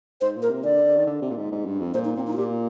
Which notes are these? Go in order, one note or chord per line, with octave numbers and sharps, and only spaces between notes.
G#2 C5
A#2
A#4
C3
D3 D5
D#3
D3
C3
A#2
G#2
G#2
G2
F2
A#2 C5
D#4
A#2 C4
D#4
F4
A#2 G4